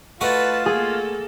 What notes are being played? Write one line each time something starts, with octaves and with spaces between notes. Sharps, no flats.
A3 F4 F#4 B4 D#5 A5
A#3 G#4 A4